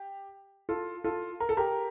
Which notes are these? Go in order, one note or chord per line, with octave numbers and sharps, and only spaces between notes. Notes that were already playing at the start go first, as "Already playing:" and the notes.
Already playing: G4
F4 A4
F4 A4
A#4
A4
G4 A#4